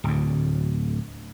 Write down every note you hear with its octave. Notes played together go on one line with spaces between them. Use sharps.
D1 D2